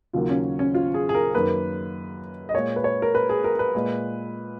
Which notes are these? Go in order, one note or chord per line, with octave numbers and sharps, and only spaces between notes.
D#2 C#3 F#3 A#3 F4
C#4
C#4
F4
G#4
G#4
A#4
F#2 D#3 A#3 B4
D#5
A#2 G#3 C#5
B4
C#5
A#4
B4
G#4
A#4
B4
A#2 G#3